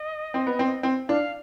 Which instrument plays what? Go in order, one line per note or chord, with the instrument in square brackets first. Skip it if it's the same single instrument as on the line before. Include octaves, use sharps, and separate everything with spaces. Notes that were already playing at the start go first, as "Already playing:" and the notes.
Already playing: [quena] D#5
[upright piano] C4
B3
C4
C4
[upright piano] D4 [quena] F5